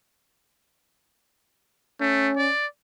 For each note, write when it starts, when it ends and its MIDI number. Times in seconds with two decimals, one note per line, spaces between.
2.01 2.30 57
2.01 2.50 61
2.37 2.66 74